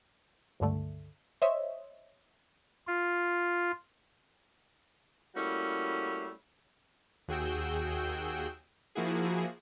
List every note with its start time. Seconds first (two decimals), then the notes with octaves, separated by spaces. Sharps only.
0.60 C#2 G2 D3 A3
1.42 C5 C#5 D#5 E5
2.87 F4
5.35 G3 A3 A#3 C#4 E4 F#4
7.28 D#2 F#4 G#4 G5 E6 G6
8.95 F3 A#3 E4 F#4 G#4